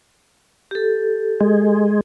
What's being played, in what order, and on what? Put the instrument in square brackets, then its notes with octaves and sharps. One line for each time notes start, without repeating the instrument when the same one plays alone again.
[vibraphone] G4 A4
[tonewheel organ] G#3